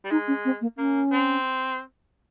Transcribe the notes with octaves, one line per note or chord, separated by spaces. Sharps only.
G3
G#3 D#4
C#4
C4
A#3
A#3 C#4
C4